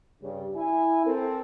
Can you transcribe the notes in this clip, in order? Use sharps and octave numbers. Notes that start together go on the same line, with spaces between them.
G2 C#3 G3
E4 G#5
C4 A4 A#4